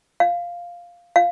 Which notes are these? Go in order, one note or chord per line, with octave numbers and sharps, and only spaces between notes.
F5
F5